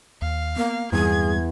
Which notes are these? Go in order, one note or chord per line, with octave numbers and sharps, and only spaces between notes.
D#2 F5
A#3 B3
E2 G2 G3 C4 G#4 G#6